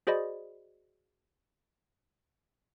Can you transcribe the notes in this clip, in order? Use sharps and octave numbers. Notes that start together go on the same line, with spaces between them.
F#4 G#4 C5 D5 D#5 B5